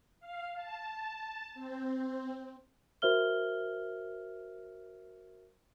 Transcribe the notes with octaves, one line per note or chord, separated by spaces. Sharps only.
F5
A5
C4
F#4 A#4 C5 E5 F6 G7